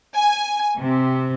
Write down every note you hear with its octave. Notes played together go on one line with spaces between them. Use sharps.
G#5
C3